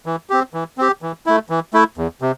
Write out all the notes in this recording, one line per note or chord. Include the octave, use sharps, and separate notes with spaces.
E3
C4 G4
E3
C4 G4
E3
A3 E4
E3
A3 E4
E2
C3